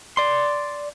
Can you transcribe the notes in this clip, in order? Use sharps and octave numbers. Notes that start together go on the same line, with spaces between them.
D5 C6